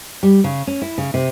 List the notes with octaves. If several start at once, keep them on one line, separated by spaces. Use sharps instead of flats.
G3
C#3
C#4
E4
C#3
C3